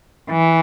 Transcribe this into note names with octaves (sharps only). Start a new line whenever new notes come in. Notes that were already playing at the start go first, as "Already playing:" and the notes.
E3